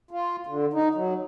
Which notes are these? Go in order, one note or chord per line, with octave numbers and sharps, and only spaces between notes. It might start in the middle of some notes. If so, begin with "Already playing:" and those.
F4
D3
D#4
F#3